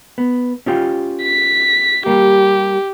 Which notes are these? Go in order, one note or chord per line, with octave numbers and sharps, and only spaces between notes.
B3
C#4 F4 G4
B6
G3 A#3 G4